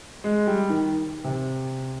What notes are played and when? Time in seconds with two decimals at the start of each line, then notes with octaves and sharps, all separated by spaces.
0.24 G#3
0.47 G3
0.69 D#3
1.24 C3